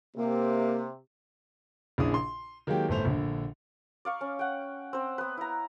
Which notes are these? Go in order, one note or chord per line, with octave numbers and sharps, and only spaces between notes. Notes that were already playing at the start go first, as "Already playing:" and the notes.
C3 A#3
A#1 C#3 D4 E4 G#4 D#6
C6
D#3 F#3 G#3 A#3 G4
G1 A2 A3 C5 F7
A#1 D3
D5 F5 C#6
C#4
F#5 G5
C4 C5
B3 B4
E4 A#5